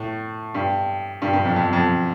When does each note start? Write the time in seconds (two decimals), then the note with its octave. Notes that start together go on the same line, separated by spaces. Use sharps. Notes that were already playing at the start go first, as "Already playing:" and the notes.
Already playing: A2
0.54 G2
1.22 G2
1.33 G2
1.45 F2
1.56 F2
1.73 F2